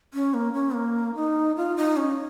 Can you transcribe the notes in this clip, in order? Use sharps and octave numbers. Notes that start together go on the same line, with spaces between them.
C#4
A#3
C#4
A#3
D#4
F4
D#4
C#4